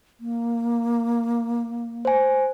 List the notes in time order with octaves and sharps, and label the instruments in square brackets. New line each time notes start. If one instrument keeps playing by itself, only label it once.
[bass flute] A#3
[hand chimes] C5 G#5